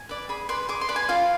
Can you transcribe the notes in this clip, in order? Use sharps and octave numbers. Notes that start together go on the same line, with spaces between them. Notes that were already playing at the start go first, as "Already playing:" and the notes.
Already playing: G#5
B4 D5
G#4 B5
B4 D5 C6
G#4 D6
C6
B4 D5
G#5
F4 F5